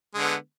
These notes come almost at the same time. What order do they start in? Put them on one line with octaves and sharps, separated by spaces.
G#3 D3 B3